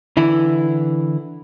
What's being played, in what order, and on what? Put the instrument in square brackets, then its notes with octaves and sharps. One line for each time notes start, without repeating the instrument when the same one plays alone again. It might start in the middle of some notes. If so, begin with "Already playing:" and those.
[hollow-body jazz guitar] D3 E3 E4